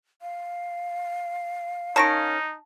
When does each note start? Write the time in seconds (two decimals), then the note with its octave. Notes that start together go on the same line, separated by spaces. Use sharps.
0.22 F5
1.96 D#3 C#4 D#4 A5 A#6 D7